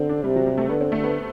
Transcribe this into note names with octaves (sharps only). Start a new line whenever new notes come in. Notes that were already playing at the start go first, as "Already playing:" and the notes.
Already playing: D3 C4
D4
C3 G3
F#3
G3
A3
D3 B3
C4
A3
B3